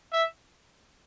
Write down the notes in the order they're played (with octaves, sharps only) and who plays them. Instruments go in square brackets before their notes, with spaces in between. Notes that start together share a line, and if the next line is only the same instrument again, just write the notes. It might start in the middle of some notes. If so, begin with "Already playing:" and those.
[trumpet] E5